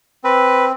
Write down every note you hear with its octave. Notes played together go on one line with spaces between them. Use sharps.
C4 B4